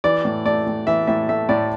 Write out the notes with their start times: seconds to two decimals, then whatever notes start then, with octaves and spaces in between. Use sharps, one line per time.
0.04 E3 D5
0.25 A2
0.46 A3 D5
0.66 A2
0.87 E3 E5
1.07 A2 E5
1.29 A3 E5
1.49 A2 D5